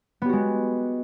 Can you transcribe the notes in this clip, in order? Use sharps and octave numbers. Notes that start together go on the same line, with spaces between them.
G#3 B3 F#4 G4